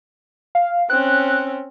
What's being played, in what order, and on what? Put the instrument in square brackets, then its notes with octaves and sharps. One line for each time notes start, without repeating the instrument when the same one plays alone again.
[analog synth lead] F5
[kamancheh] C4 C#4 [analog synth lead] F#6